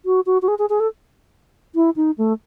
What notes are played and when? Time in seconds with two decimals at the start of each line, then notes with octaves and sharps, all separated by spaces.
0.06 F#4
0.26 F#4
0.42 F#4
0.48 G#4
0.59 G#4
0.70 G#4
0.80 A4
1.75 E4
1.96 D#4
2.18 A3